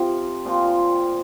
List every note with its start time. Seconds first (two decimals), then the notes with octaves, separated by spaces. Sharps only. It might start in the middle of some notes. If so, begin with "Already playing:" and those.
Already playing: C3 F3 C4
0.45 A#2 F3 C4 F4